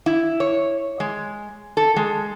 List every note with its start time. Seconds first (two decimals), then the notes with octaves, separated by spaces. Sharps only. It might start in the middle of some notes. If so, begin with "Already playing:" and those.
0.06 E4
0.40 C#5
1.00 G#3
1.77 A4
1.96 G#3